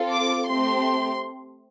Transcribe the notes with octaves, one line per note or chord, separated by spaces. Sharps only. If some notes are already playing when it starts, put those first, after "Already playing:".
Already playing: C4 F4 A4
D6
A3 C4 G4 C6